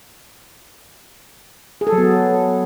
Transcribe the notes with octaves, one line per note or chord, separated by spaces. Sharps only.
G#4
A4
F#3
B3